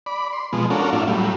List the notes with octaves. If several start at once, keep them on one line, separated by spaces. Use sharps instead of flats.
D5 B5
C6
B2 F3 G#3
C#4 D4 F4 F#4 A4 A#4
A2 D4 E4 F4
A2 F#3 G3